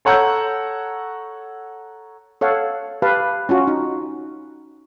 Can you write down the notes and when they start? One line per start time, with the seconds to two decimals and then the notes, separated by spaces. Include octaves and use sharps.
0.05 A4 C#5 F#5 A#5 E6 G6
2.41 A4 C#5 F5 F#5
3.02 G4 B4 F5 A5
3.49 C#4 F4 F#4
3.67 D#4